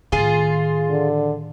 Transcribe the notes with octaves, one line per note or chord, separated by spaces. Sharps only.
A2 D#3 F4 G#4
D3